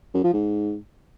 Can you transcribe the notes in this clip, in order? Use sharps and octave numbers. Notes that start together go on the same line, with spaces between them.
F#2
F3
G#2